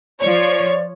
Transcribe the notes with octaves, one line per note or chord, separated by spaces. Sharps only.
F3 C#5 D5